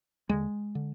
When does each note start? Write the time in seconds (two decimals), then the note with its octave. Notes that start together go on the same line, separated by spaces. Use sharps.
0.29 D#2 D3 G#3
0.75 D3